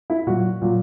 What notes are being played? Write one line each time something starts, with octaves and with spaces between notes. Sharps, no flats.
E4
A#2 F#3 F#4
A#2 F#3